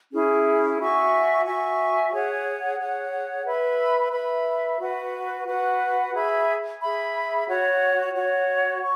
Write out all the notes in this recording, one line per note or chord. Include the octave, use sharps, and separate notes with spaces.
C#4 E4 G#4
F#4 E5 G#5 C#6
F#4 E5 G#5 C#6
G#4 C#5 F#5
G#4 C#5 F#5
B4 E5 B5
B4 E5 B5
F#4 B4 F#5
F#4 B4 F#5
G#4 E5 B5
G#4 E5 B5
F#4 C#5 F#5
F#4 C#5 F#5
C#6